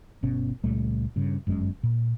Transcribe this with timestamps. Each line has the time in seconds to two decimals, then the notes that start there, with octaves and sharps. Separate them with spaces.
0.23 G1 B2 C#4
0.64 C#2 A#2 G3 A3
1.16 G2 C#3
1.47 G1 F#2 G#3 C#4
1.83 A#2